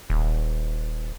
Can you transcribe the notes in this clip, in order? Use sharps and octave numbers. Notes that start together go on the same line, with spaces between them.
D#1